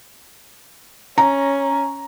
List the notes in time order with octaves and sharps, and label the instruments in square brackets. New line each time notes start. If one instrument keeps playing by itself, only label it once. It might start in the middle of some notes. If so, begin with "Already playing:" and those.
[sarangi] C#4 [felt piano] A#5